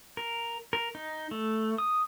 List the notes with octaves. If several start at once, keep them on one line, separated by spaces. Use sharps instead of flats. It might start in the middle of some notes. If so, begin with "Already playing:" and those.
A#4
A#4
D#4
A3
D#6